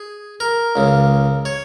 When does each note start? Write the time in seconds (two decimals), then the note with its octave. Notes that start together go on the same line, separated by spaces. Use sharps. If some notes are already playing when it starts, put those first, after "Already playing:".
Already playing: G#4
0.40 A#4
0.76 C#2 C#3
1.45 C#5